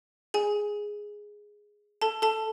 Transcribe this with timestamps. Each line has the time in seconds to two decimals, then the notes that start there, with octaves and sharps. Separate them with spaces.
0.34 G#4 G#5
2.01 A4 A5
2.22 A4 A5